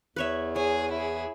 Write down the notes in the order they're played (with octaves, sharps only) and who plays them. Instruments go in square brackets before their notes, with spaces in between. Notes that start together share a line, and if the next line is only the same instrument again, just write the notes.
[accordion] E2 [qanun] B4 C#5 E5
[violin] G#4 [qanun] C#5
[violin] E4 G#4